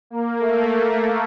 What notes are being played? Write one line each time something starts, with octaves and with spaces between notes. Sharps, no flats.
A#3
A3